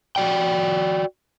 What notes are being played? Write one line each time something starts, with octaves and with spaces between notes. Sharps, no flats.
F#4 D5 G5